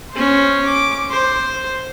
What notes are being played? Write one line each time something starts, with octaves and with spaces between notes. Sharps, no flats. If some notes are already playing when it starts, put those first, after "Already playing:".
C#4 C5
D6
C5